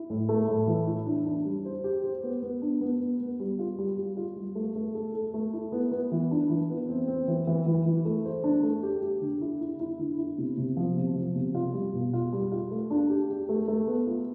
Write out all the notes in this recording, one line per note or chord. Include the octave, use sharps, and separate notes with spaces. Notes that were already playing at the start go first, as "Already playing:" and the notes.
Already playing: E4
A2
A3
A2
E3
E4
D4
D4
G3
C5
G4
C5
B3
B3
D4
B3
B3
B3
G3
F4
G3
G3
F4
G3
A3
A3
A4
A4
A3
E4
B3
B3
E3
D4
E3
B3
C4
C4
E3
E3
E3
E3
A3
C5
D4
A3
G4
G4
D3
E4
E4
E4
D3
E4
C3
C3
F3
C3
F3
C3
F4
G3
B2
F4
G3
F4
A3
D4
G4
G4
A3
A3
B3
F4